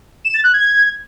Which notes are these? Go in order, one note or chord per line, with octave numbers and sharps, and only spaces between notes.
E7
A6
F#6
G#6